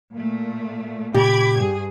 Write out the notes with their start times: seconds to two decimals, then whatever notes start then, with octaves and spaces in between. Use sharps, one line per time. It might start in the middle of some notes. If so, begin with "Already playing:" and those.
0.13 A#2 A3
1.14 A#2 C#3 G4 B5 D6 G#6
1.56 G2 G#4